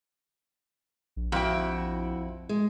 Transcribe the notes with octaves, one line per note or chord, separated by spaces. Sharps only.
A#1
F2 E4 F#4 G5
G#3